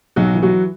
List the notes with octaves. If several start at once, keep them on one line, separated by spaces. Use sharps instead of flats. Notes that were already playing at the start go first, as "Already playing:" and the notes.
B1 F#3 F#4
E3
F#3 F#4